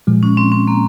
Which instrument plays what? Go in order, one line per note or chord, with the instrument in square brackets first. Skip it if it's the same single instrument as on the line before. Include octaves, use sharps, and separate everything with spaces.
[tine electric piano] A#2 F3 G#3
[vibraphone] C#4
C4
C4
A#3